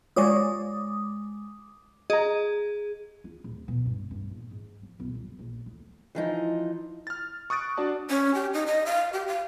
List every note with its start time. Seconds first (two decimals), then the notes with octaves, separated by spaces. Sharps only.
0.16 G#3 F4 C#5 D5 D6 D#6
2.10 G#4 D#5 A#5
3.24 F4
3.44 D1
3.68 B2
3.86 G2
4.11 G2
4.30 A#1
4.51 G#2
4.82 F3
5.00 B1
5.15 G1
5.39 A#1
5.66 D2
6.15 E3 F3 D#4
7.07 F6 A6
7.50 C#6 D#6 F#6 A6 D7
7.77 D4 F#4 D5 A5
8.10 C#4
8.35 G4
8.54 D#4
8.66 D#5
8.86 F5
9.13 G4
9.28 F5